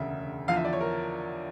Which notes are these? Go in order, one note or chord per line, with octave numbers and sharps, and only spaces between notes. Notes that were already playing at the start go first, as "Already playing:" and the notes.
Already playing: E1 D2 C#3 E5
E2 D3 F3 F5
E5
D5
C#5
A#4